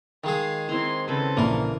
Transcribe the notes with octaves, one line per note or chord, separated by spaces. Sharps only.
D#3 G#3 G#4 F5
C4 E4 A#5 C6
C#3 C4 A4 B4
A#1 E3 A#3 A#4